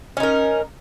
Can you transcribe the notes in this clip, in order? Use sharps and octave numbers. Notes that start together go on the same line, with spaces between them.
C#4 D#4 A#4